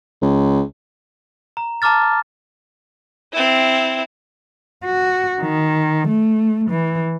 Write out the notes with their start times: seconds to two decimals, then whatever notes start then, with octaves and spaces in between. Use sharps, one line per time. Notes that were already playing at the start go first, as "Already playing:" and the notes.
0.22 C#2
1.57 A#5
1.82 A5 A#5 D6 F6 A6
3.33 C4 E4
4.85 F#4
5.41 D#3
6.08 A3
6.70 E3